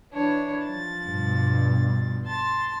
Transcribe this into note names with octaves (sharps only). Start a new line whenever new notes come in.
E3 D4 C#5
F3 A6
G2 B2
A5 C6 A6